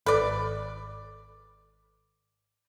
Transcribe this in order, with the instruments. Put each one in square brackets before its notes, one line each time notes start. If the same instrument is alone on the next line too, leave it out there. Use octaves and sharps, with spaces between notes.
[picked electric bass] G#1 [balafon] A4 [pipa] B4 D5